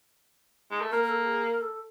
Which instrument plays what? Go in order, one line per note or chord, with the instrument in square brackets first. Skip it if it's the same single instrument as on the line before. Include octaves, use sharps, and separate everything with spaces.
[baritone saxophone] G#3
A3
[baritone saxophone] A#3 [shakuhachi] A#4
[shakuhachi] A#4
A4
G#4
A#4
A4